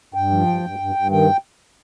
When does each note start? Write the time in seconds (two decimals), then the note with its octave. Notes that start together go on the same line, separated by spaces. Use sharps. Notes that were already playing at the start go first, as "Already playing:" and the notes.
0.14 G2 G5
0.31 F3
0.47 G2
0.63 G2
0.79 G2
0.95 G2
1.11 D#3 G5